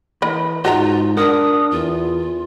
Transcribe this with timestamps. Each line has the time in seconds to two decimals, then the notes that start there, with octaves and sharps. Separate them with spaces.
0.22 E3 A#4 D#5 B5
0.65 G#2 F4 F#4 D#5 A#5
1.17 D4 A#4 F#5 D#6
1.72 E2 F4